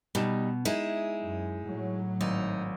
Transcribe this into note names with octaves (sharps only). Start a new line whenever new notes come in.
B2 G3 D#4 E7
G#3 D#4 E4 G#4
F#2
A2 F#3
G#1 D#4